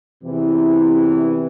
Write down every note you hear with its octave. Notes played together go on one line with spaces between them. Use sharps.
E2 C3 E3